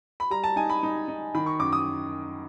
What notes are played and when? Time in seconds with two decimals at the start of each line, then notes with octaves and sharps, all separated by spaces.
0.20 B5
0.30 G3 A#5
0.44 A5
0.56 D#4 G#5
0.70 B5
0.83 D#4
1.08 D#4
1.35 D#3 B5
1.46 C#6
1.60 F#2 D6
1.73 D#6